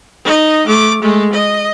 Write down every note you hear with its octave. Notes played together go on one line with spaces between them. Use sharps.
D#4 D#5
A3 D6
G#3 A3
D#5